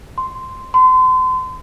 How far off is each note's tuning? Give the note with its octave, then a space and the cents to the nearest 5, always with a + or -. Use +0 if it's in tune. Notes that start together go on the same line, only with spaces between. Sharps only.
C6 -5
C6 -35